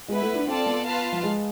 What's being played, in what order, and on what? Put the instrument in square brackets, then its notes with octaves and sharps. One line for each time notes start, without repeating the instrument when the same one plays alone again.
[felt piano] G#3 [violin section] B3 E4 B4
[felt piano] A3
D4
[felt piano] C4 [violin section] F4 A4 D5 A5
[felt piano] B3
[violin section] F4 B4 F5 A5
[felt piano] F3
G#3